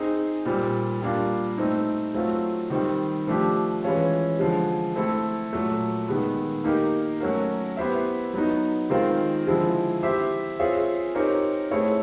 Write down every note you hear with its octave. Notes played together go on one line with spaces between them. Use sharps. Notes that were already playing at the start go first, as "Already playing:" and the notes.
Already playing: C4 D#4 G#4
A#2 G3 C4
G3 A#3 D4 F4 A#4
A3 C4 D#4
F#3 A3 C4 F4
D#3 G3 C4
F3 A3 D4 G4
E3 G#3 C#4 F4
D3 F3 G#3
A3 C4 E4 A4
A#2 F#3 A3
D#3 G#3 B3
A#3 D#4 G4 A#4
F#3 A3 C#4 F#4 A#4
B3 E4 G4 C5 E5
F#3 B3 D#4
D#3 G#3 C4 F4 A#4
D3 F3 G#3 C4 E4
C4 E4 G4 C5 E5
C4 F4 G#4 C#5 E5
C4 D#4 G4 A#4 C#5
A3 C4 E4 G#4 C#5